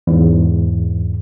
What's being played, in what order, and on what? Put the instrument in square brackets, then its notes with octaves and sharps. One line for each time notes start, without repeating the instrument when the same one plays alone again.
[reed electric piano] E2 G#2